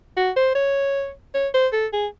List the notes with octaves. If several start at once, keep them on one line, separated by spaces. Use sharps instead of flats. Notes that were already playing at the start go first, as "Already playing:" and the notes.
F#4
C5
C#5
C#5
C5
A4
G#4